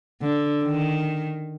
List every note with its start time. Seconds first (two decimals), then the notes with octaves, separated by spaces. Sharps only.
0.21 D3
0.63 D#3